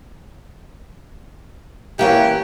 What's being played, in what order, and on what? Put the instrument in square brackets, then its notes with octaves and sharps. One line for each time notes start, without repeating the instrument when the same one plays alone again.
[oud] E3 A#3 C#4 [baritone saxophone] G4